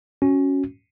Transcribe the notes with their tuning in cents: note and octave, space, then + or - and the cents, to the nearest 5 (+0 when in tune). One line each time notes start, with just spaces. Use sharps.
C#4 +0 F#4 +0